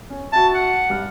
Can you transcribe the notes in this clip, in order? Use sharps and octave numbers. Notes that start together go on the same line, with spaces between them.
C#4
F#4 E5 A5
F#5
G2 F6